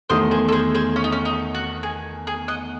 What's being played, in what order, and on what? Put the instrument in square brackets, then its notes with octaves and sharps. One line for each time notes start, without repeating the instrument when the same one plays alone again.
[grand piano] E2 D#3 A3 [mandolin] C5 D#5
[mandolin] G#4 C5
A4
G#4 C5
G#4 C5
C#4
D#4
C#4
D#4
F#4
G#4
G#4
D#5 F#5